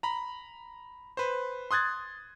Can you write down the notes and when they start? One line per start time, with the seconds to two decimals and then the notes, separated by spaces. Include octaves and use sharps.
0.03 A#5 B5
1.17 B4 C5
1.71 C6 D#6 F#6 G#6 A6